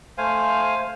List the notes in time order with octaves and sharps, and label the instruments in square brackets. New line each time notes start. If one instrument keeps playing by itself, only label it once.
[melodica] A3 C5 F5 G#5